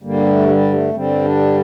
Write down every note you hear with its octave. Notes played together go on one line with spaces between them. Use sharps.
G2 D3 G3 A#3
A3
G3
A3
G2 D3 G3 C4
D4